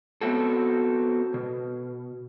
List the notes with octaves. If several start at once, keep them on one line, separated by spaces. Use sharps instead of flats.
B3 C4 F#4 A4
B2